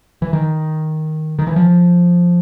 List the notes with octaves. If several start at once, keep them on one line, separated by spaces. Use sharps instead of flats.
E3
D#3
D#3
E3
F3